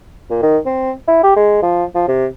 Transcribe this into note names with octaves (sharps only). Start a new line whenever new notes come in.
A#2
D#3
C4
E4
G4
G#3
F3
F3
C3